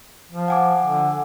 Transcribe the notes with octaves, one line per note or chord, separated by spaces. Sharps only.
F3
F#5 G#5 D6
D3